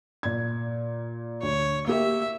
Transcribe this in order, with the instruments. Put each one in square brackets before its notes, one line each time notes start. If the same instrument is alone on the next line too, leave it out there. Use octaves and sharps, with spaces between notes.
[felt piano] A#2 G#6
[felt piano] D2 [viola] C#5
[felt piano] A#3 G4 [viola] E5